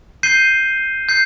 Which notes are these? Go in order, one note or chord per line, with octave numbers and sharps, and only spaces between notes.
G6 C7 D#7 G7
G6 C7